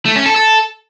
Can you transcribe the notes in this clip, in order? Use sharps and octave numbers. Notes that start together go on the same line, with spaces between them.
A3
C#4
A4
A4